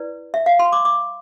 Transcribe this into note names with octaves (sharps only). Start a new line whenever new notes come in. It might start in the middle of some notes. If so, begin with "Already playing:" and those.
Already playing: E4 B4 D5
E5
F5
C6
D6
D6